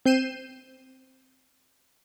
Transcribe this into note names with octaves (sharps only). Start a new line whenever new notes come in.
C4 G6 C7 D#7 E7